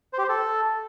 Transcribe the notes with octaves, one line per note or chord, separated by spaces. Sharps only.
C5
G4
C5
A4